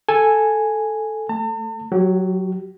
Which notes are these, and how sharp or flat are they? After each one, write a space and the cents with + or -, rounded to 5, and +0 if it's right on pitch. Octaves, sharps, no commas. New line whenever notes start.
A4 +0 G#5 +0
A3 +0 A5 +45
F#3 +0 G4 -30